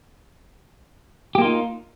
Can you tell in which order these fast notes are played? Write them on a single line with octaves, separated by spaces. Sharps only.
G4 A#3 F4 D#4